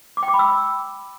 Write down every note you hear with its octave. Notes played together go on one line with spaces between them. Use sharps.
D6
G5
D6
B5
E6